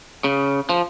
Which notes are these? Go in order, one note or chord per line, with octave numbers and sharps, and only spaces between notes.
C#3
F3